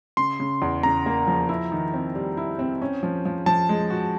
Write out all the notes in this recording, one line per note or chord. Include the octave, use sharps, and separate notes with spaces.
C#3 C6
C#3
E2
C#3 A#5
A#3
F3
E4
D#3
C4
G3
E4
C4
C#4
F3
F3
F3 A5
G#3
F#4